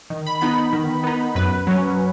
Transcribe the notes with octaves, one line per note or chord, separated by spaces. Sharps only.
D#3
B5
B3 D#4 B5
D#3
B3 D#4
F#2 B4
F#3 C#4